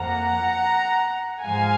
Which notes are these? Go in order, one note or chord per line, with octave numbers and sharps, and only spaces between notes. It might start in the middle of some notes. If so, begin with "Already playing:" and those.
Already playing: F2 F3 A#3 F#5 A#5
G#2 F3 G#3 F5 G#5